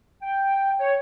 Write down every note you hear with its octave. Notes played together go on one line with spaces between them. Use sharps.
G5
C#5